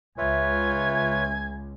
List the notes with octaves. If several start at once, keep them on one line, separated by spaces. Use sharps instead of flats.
C#2 F4 B4 C#5 E5 G#5